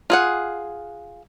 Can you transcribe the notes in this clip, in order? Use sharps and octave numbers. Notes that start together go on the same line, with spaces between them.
F4 G#4 F#5